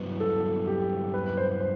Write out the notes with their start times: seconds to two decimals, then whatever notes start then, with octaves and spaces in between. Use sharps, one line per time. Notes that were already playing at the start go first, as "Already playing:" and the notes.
Already playing: G2 F#3 B3 E4 B4
0.20 A4
0.67 G4
1.14 B4
1.37 C5
1.60 C5